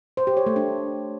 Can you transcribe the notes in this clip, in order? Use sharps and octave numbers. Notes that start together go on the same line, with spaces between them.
C5
G4
C#5
A3
D4